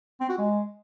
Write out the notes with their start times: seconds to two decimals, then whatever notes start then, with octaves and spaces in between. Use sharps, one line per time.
0.20 C4
0.29 F#4
0.38 G#3